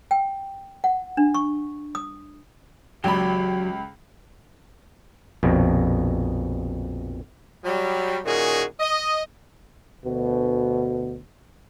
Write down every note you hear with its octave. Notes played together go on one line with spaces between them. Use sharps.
G5
F#5
D4
C#6
D#6
C#2 F#3 G4 B5
A#1 F2 B2
F#3 G3
A#2 D#3 C#4 F#4 G#4
D#5
D2 B2